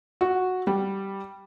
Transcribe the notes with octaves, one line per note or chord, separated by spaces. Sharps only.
F#4
G3